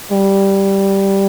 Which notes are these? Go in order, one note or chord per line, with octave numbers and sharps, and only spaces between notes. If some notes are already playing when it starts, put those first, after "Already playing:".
G3